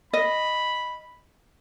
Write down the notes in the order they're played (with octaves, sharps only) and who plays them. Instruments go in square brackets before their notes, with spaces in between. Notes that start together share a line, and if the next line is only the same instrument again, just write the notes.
[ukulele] D#5 [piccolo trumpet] B5